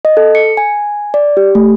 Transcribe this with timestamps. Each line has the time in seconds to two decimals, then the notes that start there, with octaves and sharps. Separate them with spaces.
0.05 D#5
0.17 A4
0.35 C#7
0.57 G#5
1.14 D5
1.37 G4
1.55 A3